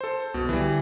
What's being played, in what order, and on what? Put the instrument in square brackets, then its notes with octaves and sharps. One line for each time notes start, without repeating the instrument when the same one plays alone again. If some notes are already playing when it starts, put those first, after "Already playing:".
[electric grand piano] A4 C5
[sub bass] C2 [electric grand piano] B2
[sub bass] D3 [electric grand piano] E3 G3